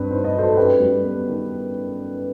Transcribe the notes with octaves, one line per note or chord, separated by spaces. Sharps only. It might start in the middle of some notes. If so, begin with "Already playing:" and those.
Already playing: G2 C4 B4
D#4 C5
D#5
F#3 A4 C5
C5
F#2 G4 B4
G3
B3
D#3